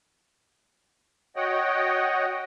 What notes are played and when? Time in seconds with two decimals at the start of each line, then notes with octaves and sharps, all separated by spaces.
1.36 F#4 C#5 D#5 F#5 G5